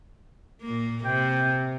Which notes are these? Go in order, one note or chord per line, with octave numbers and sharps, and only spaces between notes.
A#2 A#3
C3 G5